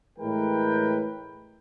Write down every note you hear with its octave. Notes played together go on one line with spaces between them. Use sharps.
A2 E3 G#3 A#4 B4 G5